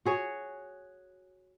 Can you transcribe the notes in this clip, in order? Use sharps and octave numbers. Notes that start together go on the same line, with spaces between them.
F#4 G#4 C#5